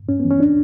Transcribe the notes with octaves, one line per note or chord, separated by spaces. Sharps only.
G2 C#4
B3
E3
C#4
D4